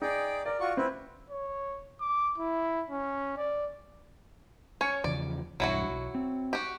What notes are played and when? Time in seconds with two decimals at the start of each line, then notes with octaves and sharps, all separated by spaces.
0.02 D#4 G#4 D5 G5
0.45 A#4 D5
0.60 F4 F#4 C#6
0.77 C4 E4 B4
1.30 C#5
2.01 D6
2.38 E4
2.90 C#4
3.37 D5
4.81 C#4 C#5
5.04 E2 C#3 F3 D5
5.60 B1 E2 G2 F#3 E4 F#4
5.89 B1
6.14 C4
6.53 F#4 G4